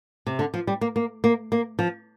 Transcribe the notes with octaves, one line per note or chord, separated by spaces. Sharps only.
C3
D3
F3
G3
A#3
A#3
A#3
A#3
F3